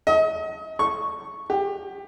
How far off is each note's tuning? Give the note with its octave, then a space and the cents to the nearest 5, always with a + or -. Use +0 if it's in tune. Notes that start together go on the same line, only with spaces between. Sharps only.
D#5 +35
C#6 -5
G4 +20